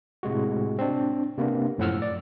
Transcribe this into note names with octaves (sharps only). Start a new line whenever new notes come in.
A2 C3 G#3 F#4
C4 D4
C3 A#3 B3 D4
F#2 A2 F3 F#5 E6 F6
D5